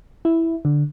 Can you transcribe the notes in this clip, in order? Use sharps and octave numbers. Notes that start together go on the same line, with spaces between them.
E4
D3